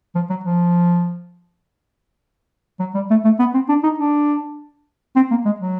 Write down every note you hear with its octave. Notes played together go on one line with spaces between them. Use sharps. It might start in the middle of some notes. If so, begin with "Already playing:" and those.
F3
F#3
F3
F#3
G3
A3
A3
B3
C4
D4
D#4
D4
C4
A#3
G#3
F#3